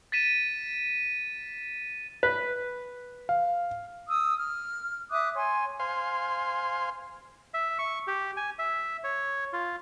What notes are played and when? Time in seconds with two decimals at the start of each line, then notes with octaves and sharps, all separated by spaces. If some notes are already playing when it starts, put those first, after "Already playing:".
0.12 A6 B6 D#7 E7
2.23 B4
3.29 F5
4.08 D#6 E6
4.37 F6
5.11 E5 D6 D#6 F#6
5.35 C#5 G#5 C6
5.80 C5 F5 G#5 C6
7.54 E5
7.79 C#6
8.07 G4
8.37 G#5
8.59 E5
9.04 C#5
9.53 F4